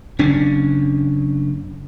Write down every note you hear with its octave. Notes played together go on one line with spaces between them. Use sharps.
F#1 C#4 D4